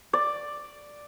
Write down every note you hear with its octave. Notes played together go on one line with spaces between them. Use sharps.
D5